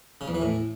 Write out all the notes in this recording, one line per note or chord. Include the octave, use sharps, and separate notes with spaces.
C#3
E2
E3
A2